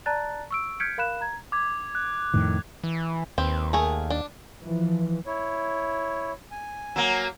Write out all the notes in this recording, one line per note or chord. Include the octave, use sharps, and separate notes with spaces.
D5 A5 A#5 F#6 A6
C#6 E6 D7
F6 G6 G#6 B6 C#7 D7
A#4 F5 B5 F#6 E7
A#5 G#6
D6 G#6
F#6
F2 A2 D#3
E3
D#2 C4 B4
A3 G#4 A#4
D4
E3 F3
E4 C#5
G#5
F#3 A#3